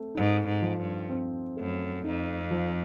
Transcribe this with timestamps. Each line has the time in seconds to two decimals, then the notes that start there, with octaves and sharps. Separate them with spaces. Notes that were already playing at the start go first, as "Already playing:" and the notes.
Already playing: A3 C4
0.15 G#2 D#4
0.46 G#2
0.62 F3
0.78 G2
1.10 C4
1.57 F#2 A3
2.04 F2 D#4
2.51 F3